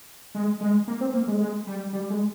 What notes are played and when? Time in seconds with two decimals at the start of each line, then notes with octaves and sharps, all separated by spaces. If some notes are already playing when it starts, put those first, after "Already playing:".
0.35 G#3
0.61 G#3
0.88 A#3
1.01 C4
1.14 A#3
1.27 G#3
1.40 G#3
1.67 G3
1.93 G3
2.10 G#3